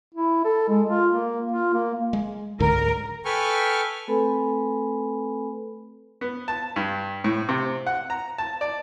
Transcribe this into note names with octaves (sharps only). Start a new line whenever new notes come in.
E4
A4
G#3
F4
A#3
F4
A#3
G#3
C#2 G#2 D3 A#4
A4 B4 G5 G#5 C#6 F6
A3 C4 A4 B4 G#5 B5
B3
A5
G2
A2
C3
F#5
A#5
A5
D5